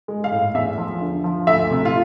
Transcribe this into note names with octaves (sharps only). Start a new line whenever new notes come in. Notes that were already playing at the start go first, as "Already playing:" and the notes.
G#3
F5
A2
E2 E5
F3
D3
F3
D2 E5
C3
F4